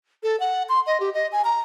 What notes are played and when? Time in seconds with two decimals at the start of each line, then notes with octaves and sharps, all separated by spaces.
0.23 A4
0.40 F#5
0.69 C6
0.87 D#5
1.00 G4
1.14 D#5
1.32 G#5
1.45 A#5